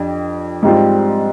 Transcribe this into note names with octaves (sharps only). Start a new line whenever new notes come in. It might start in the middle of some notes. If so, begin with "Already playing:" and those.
Already playing: F2 D4 G4
G#2 G3 C4 F4